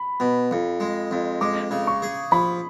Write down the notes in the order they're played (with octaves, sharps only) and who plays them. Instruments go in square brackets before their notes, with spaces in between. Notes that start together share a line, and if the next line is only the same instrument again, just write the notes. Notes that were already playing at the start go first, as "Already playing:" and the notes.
Already playing: [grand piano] B5
[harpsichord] B2
F2
G#3
F2
[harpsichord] G#3 [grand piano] D6
[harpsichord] C#3
[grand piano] C#6
[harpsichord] G#4
[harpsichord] F3 [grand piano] B5